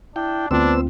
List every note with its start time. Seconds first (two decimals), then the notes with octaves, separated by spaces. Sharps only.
0.16 D4 E4 G5
0.51 D2 B3 C4 D4 F4 C5 E6